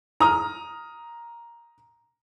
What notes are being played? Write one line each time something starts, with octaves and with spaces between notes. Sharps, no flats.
A#5 D#6 F6